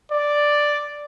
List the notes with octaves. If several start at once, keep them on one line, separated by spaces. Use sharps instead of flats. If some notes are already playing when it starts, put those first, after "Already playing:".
D5